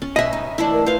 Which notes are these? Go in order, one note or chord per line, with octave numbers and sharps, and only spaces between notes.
C#4
B2 B4 D#5 E5 G#5
D#4
D2 E3 D4 E4
A#4
F4 B4 C5 F5